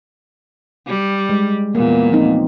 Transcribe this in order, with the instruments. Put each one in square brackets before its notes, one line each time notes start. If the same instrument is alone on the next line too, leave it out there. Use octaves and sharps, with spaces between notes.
[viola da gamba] G3
[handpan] G#3
[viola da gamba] E2 A#2 [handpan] A#3
[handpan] F3 C4 D#4